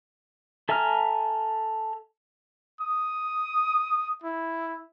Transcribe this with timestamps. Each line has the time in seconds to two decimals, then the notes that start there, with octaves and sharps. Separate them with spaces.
0.69 A4 E5 G#5 A#5 F6
2.81 D#6
4.24 E4